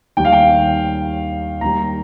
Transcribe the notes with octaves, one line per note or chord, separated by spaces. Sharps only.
D#2 D#3 G3 G5
F5
G5
D#2 D#3 G3 A#5